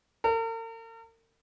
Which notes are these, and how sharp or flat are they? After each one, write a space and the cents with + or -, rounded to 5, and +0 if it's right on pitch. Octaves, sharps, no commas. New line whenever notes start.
A#4 -45